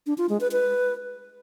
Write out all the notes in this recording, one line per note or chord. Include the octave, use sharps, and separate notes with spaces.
D4
F4
G#3
B4
B4